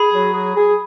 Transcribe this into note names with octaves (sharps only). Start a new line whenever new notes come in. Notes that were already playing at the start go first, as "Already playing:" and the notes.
Already playing: G#4 B5
F#3
G#4
G#4